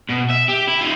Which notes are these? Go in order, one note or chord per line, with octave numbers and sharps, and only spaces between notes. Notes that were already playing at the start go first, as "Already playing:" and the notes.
B2
E5
G4
E4
D#4 F4